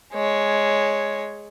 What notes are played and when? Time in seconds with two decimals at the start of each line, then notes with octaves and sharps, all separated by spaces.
0.14 G#3 C#5